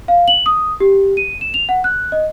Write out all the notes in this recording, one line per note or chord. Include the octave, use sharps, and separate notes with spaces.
F5
F#7
D#6
G4
D#7
E7
F7
F#5
F#6
D#5